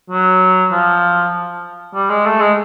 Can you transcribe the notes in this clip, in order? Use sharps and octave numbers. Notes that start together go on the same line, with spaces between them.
F#3
F3
G3
G#3
A3
G#3